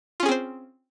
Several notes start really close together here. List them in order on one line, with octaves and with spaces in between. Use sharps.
F4 C#4 G#4 C4 C5